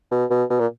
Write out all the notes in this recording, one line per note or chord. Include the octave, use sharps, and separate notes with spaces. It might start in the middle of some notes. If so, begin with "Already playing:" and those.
B2
B2
B2
A#2